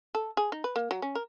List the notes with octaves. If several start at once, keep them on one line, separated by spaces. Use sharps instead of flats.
A4
G#4
D#4
B4
A#3
F#3
C#4
A#4